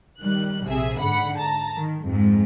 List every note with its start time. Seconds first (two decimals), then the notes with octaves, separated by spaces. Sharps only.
0.21 D#3 G3 F#6
0.64 A#1 C3 G#4 E5
0.97 G#2 D3 F#5 B5
1.37 A5 A#5
1.73 D#3
2.04 F2 G#2